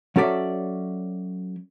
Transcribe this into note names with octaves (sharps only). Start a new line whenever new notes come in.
F#3 C#4 A4 D5 E5